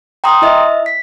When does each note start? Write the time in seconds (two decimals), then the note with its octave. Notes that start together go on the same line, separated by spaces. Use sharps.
0.24 G5 A#5 C6 D#6
0.42 E4 D#5 E5
0.86 B6